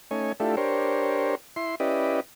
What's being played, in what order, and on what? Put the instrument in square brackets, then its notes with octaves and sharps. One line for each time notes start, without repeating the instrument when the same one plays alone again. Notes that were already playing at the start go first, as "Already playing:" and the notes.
[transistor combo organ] A3 C#4 D#4 C#5 G#5
A3 D4 E4 F4 G4 A4
D4 G4 A#4 C5 C#5
E4 C6
C#4 E4 G4 B4 D5 D#5